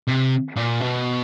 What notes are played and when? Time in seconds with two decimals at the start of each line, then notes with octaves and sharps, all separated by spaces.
0.07 C3
0.56 A#2
0.80 B2